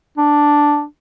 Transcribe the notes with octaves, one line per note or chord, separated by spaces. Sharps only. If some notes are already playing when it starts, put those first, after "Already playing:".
D4